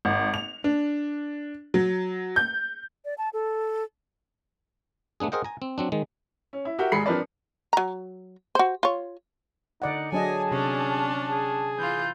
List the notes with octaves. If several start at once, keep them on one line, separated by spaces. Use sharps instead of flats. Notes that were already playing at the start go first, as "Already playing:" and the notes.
G#1
F7
D4
F#3
G6
D5
A5
A4
A3 B3 D4 G#4
G#4 A#4 C5 D#5 F#5 G5
G#5 A#5
C4
F#3 C4 D4
D#3 G#3
C#4
E4
F#4 G4 A#4 E5 F#5 G5
G#1 G#2 G#4 B5 C7 C#7
F3 C4 D4 A#4 B4 D5
F#3 A#5
F#4 C5
F4 C#5
D3 D#4 D5 F#5
F#3 D4 G#4 D#5 G#5 A5
C3 C#4 D4
G#4
E3 F4 G6